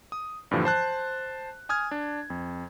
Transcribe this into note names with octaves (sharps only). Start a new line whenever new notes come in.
D#6
G2 A#2 D3 E3 F3 G3
C5 A5 F#6
G#5 D#6 F6 G#6
D4
F2